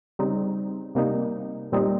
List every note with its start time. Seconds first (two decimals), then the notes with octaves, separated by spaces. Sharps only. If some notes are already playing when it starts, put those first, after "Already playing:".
0.19 C#3 G3 C4 D#4
0.95 C3 G3 A#3 D#4
1.72 A#2 G3 C4 D#4